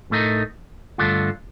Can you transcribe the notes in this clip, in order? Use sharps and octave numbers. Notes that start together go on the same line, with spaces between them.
A2 A3 D#4 A#4
G2 D3 A3 D4 F4